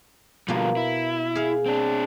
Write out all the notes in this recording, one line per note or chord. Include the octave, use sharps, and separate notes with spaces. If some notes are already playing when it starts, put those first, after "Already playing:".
B2 D3 F3 G3 A#3
E4
G#4 F5
C4 D4